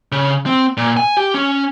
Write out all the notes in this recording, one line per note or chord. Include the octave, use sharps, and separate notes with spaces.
C#3
C4
A#2
G#5
G4
C#4